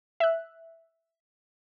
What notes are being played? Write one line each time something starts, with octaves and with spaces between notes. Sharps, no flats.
E5 F#6